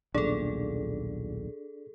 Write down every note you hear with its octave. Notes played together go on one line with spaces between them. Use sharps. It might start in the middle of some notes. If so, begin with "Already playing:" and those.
D#1 B1 A#2 D4 G#4 A4 D5